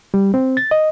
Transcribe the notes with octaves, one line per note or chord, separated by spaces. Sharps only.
G3
C4
A6
D#5